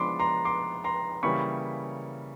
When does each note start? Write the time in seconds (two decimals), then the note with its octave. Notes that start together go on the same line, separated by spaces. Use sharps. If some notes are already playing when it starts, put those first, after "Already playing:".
Already playing: F3 G#3 B3 D4 B5 C6 D6
0.19 A#5 C6
0.45 C6 D6
0.84 A#5 C6
1.23 C#3 E3 G3 A#3 C#4 B5 C#6